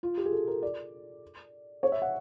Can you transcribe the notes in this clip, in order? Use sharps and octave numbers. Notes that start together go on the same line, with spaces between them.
F4
G4
G#4
A4
A#4
D5
C#5
E5
F#5